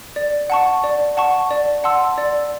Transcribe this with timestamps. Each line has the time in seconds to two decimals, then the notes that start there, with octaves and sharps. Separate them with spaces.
0.16 D5
0.50 F#5 A5 C#6
0.84 D5
1.17 F#5 A5 C#6
1.51 D5
1.84 F#5 A5 C6 E6
2.18 D5